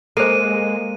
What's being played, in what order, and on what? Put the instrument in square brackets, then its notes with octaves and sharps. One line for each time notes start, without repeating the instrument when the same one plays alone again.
[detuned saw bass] G#3 [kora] A#3 [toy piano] A4 C5 [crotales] D#7